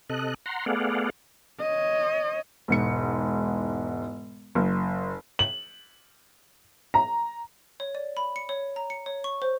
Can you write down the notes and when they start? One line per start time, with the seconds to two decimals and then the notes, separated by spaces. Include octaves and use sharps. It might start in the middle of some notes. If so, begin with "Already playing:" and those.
0.10 C3 A4 D#5 F#6
0.46 F#5 A#5 C6
0.66 A3 B3 G#4 D5 F5 F#5
1.60 C#5 D#5
2.68 E1 G#2 C#7
4.55 F#1
5.39 F#7
6.94 A#5
7.80 C#5
7.95 D5
8.17 B5
8.36 C#7
8.49 C#5
8.76 A#5
8.90 C#7
9.06 C#5
9.24 C#6
9.42 C5